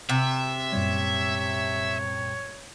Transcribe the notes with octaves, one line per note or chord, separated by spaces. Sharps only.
C3 E5
F#2 A#2 G3 C#5